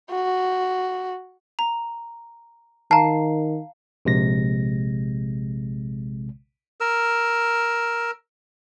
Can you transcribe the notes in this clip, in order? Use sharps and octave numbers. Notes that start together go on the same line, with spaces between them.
F#4
A#5
D#3 F5 A5 A#5 C7
A#1 C3 G#3 A#6
A#4 E6